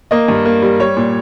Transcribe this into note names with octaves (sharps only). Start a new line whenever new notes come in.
A#3 D#5
G2
A#3
G3
G3 C#5
A#2